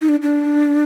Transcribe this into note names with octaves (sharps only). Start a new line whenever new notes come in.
D#4
D4
D4